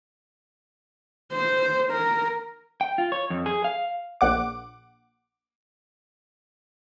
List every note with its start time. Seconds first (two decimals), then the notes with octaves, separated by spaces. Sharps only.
1.32 C5
1.91 A#4
2.81 G5
2.98 F4
3.12 C#5
3.30 F2
3.46 G#4
3.64 F5
4.21 A#1 F#5 D6